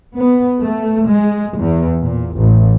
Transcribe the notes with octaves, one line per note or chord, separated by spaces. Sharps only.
B3
A3
G#3
E2
A#2
A1